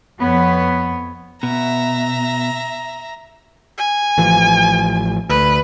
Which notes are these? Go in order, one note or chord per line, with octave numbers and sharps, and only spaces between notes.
F2 B3 C#5
B2 E5 A#5
G#5
A1 E3 F3
D2 B4